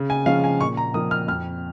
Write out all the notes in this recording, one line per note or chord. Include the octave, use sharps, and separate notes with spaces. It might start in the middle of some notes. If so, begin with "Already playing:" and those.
Already playing: C#3
G#5
F3 G#3 C#4 F5
G#5
A#2 C#6
A#5
F3 A#3 D#6
F6
F2 F6